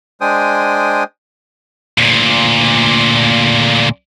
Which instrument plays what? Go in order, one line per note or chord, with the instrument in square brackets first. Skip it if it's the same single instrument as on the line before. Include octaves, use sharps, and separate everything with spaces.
[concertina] G#3 D4 C5 G5 G#5 D#6
[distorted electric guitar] D2 A#2